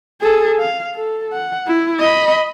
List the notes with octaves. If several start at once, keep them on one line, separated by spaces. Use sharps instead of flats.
G#4 A4
F5
A4
F#5
E4
D#5 B5